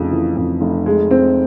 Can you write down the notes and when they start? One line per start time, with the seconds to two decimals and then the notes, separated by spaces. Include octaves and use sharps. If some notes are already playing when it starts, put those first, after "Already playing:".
Already playing: F1 F2 C#3
0.12 E3
0.37 F2
0.61 F1
0.86 G#3
1.11 C4